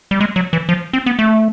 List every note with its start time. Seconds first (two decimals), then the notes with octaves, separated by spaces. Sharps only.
0.11 G3
0.21 G#3
0.36 F#3
0.53 E3
0.69 F3
0.93 C4
1.06 B3
1.19 A3